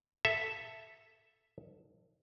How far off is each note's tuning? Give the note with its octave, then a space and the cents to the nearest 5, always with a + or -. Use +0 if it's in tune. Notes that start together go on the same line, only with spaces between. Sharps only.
A4 +5 E5 +0